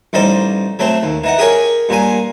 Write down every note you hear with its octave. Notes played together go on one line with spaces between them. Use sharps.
A1 G3 D#4 C5 D5
F#3 A3 C4 C5
D#2
E3 D#4 F#5
G4 G#4 A#4 C#5 G#5
G2 A#2 A#3 G#5